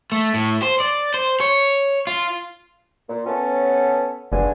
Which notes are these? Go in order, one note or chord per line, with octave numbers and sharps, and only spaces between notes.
A3
A2
C5
D5
C5
C#5
F4
A#2
B3 C#4 A4
F#1 G2 D3 G#4